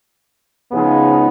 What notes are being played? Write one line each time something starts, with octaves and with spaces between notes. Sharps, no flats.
C#2 C#3 F3 G#3 B3 D#4